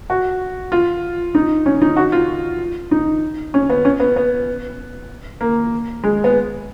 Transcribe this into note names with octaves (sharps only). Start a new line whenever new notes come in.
F#4
F4
D#4
C#4
D#4
F#4
F4
D#4
C#4
B3
C#4
B3
B3
A#3
G#3
B3